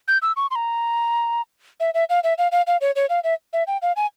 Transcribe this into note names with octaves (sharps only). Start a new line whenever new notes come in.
G6
E6
C#6
C6
A#5
E5
E5
F5
E5
F5
F5
F5
C#5
C#5
F5
E5
E5
G5
F5
G#5